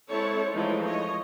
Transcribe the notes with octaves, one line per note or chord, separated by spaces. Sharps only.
G#3 C4 E4 A4 C#5 A5
E3 F3 G#3 A3 D#4
C#5 D#5